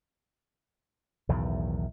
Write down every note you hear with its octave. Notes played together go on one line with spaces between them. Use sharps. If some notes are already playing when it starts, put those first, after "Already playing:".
B1 E2 A2 D#3